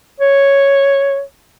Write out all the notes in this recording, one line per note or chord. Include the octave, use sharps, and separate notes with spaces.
C#5